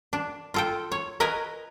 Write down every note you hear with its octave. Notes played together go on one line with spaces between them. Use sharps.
D4
F4 A4 G5
C#5
A#4 B4 D#5 G#5